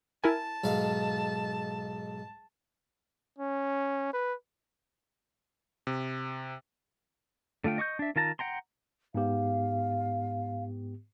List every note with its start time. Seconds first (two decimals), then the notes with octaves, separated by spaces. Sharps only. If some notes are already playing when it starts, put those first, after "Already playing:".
0.24 E4 A#4 G#5 A5
0.64 B1 G#2 F5
3.39 C#4
4.13 B4
5.87 C3
7.64 D3 A3 F4 G5
7.78 D#5 C#6 D6 G6
7.99 D4 E5
8.16 D#3 F4 A5 A#5
8.39 F#5 G5 A#5 C6
9.15 G#2 B3 G4 F5